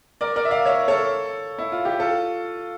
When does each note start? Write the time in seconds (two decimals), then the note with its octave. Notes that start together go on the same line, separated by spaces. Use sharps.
0.21 A#4 D5
0.36 A#4 D5
0.45 E5
0.51 D5 F5
0.66 C#5 E5
0.88 A4 C#5
1.59 E4
1.72 F4
1.85 G4
1.99 F4 A4